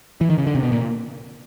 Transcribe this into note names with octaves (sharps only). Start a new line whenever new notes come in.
E3
D#3
C#3
D3
C3
B2
A#2